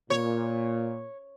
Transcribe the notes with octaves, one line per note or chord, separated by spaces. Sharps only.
A#2 C#5